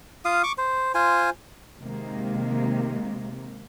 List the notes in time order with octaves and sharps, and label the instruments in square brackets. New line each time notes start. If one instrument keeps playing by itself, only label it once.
[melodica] F4 F5 D#6
C#6 D6
C5
F4 C5 G#5
[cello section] C3 D#3 G#3 A#3